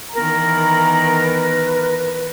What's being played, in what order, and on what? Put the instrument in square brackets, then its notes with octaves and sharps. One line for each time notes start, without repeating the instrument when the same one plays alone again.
[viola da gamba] D#3 E3 B3 [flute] A#4 [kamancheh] A#5
[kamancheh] B4